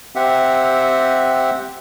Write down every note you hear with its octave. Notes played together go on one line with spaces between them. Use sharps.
C4 G4 E5 F#5